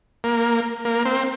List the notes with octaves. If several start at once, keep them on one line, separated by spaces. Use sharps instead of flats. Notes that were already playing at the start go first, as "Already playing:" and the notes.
A#3
A#3
C4